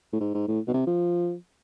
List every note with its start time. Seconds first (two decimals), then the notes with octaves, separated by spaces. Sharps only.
0.13 A2
0.21 G#2
0.34 G#2
0.48 A2
0.68 B2
0.74 C3
0.87 F3